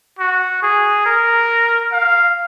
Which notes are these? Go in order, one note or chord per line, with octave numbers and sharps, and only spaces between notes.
F#4
G#4
A#4
F5